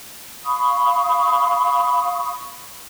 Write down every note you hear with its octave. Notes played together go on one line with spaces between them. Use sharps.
F5 B5 C#6 D#6